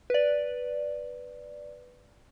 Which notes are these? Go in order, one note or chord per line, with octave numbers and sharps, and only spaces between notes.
B4 D5